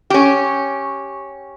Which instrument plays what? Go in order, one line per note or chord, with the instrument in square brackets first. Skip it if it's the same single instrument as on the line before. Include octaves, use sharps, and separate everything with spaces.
[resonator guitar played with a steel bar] C#4 G4